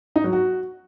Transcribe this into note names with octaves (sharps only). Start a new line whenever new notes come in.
D#4
F#3
F#4